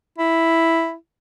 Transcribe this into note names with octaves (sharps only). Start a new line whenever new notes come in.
E4